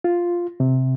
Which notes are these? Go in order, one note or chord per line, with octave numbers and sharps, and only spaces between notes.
F4
C3